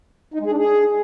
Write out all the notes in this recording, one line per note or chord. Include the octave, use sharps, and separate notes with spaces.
D#4
G#3
G#4
D4
G#4